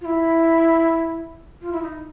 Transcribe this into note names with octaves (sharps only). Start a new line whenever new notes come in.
F4
E4
F4
E4
D#4